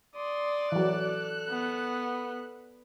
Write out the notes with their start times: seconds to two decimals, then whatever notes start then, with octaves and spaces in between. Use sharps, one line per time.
0.16 D5 C6 D#6
0.72 E3 F#3 A4 F#6
1.49 B3